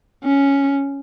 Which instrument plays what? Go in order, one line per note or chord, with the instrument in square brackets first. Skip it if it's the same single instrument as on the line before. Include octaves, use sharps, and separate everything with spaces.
[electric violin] C#4